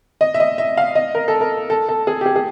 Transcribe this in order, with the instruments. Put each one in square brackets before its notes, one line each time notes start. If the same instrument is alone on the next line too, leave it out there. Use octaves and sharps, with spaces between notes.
[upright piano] D#5
E5
D#5
E5
F5
D#5
A#4
A4
A#4
A4
A4
G#4
G4
G#4
G#4